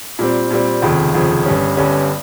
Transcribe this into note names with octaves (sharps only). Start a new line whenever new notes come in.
A#2 G3 C4
A#2 G3 C4
F1 D#2 C#3 F3
F1 D#2 C#3 F3
G1 G2 G3 C#4
G1 G2 G3 C#4